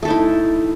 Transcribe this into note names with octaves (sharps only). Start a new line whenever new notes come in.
A3 D#4 E4 A4